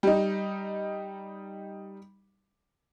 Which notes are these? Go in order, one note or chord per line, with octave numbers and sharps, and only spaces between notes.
G3 D#4